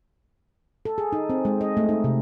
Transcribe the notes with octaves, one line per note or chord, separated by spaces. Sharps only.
A4
G#4
D#4
C4
G#3
D#5
A3
D#4
C3